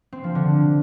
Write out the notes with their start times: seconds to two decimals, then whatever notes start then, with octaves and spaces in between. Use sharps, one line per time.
0.12 C4
0.24 F3
0.35 D3